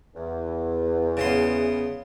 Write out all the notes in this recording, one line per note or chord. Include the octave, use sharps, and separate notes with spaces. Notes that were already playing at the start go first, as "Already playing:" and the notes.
E2
C#3 B3 C6